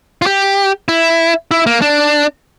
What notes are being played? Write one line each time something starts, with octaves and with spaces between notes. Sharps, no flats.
F4
G4
E4
E4
A#3
D4